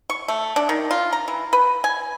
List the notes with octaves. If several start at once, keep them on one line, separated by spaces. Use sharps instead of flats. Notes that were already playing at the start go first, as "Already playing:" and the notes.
C#6
A3
D4
D#3
F4
A#5
E3
B4
G#5